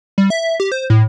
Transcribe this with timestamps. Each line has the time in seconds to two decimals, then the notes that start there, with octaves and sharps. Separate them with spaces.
0.18 G3
0.30 E5
0.60 G4
0.72 C5
0.90 A2